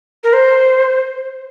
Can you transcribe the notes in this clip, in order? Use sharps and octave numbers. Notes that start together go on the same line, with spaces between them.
A#4
C5